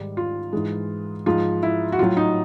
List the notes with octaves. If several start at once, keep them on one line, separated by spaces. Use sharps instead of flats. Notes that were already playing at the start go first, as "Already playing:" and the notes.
Already playing: G#2 D#3 G3
F4
G#2 E3 G#3
G#2 F3 G#3 F4
E4
F#4
A2 F#3 F4
D#4